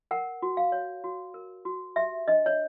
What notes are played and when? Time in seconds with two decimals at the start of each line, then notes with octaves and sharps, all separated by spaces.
0.11 A#4 F#5
0.42 F#4
0.57 F5
0.72 C#5
1.04 F#4
1.34 A#4
1.65 F#4
1.96 G4 E5
2.28 D4 D#5
2.46 C#5